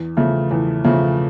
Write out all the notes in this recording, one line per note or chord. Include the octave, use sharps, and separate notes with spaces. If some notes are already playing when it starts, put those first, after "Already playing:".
Already playing: E2
C#3 F3 A3
E2
C#3 F3 A3